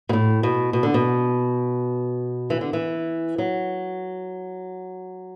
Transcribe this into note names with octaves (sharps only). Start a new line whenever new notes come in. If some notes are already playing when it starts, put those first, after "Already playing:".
B2
A2
B2
B2
D3
B2
E3
D3
E3
F#3